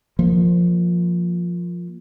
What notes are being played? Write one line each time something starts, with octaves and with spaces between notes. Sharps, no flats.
F3 A#3